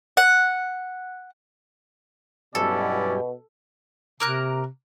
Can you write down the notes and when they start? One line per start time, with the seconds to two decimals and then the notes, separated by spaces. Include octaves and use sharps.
0.17 F#5
2.55 G2 B2 F#3 C#4 E4 G4 A4 D5
4.20 C3 A#3 A#4 F#6